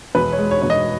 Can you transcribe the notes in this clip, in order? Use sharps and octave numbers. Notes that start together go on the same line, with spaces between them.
E1 B4
C#5
G#3
C#5
E1 C#5
D#5